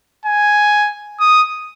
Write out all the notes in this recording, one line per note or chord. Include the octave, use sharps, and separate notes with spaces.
G#5
D#6